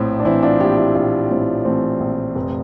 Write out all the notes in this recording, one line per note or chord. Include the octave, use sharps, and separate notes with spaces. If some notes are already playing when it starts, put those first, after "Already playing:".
Already playing: A#1 A2 C4 E4
D4
E3 C4 E4
D4 F4
A#1 E4 G4
E4 G4
A#1 D4 F4
A2 C4 E4
E3 A3 C4
A#1
F1